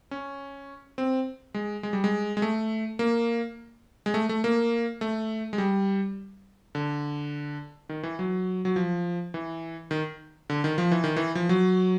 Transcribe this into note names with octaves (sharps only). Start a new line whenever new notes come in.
C#4
C4
G#3
G#3
G3
G#3
G#3
A3
A#3
G#3
A3
A3
A#3
A3
G#3
G3
D3
D#3
E3
F#3
F#3
F3
E3
D#3
D3
D#3
F3
E3
D#3
E3
F3
F#3